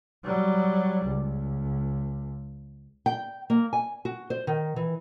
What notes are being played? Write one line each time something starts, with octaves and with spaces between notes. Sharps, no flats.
F#3 G3
C#2
G5
A#3
G#5
F#4
C5
D#3
E3